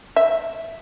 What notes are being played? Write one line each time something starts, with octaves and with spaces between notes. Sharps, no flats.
E5